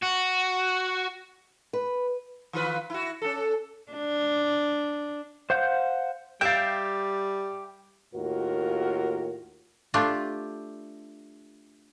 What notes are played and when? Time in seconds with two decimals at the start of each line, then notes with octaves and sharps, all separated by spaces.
0.03 F#4
1.73 B4
2.53 D#3 F4 B4
2.90 E4 F#4
3.22 C#4 A4
3.92 D4
5.50 C5 F5 F#5 G6
6.41 G3 G4 E5 F5 G5 G6 A6
8.14 D#2 A2 F4 F#4 A#4
9.94 A3 D4 F4 G4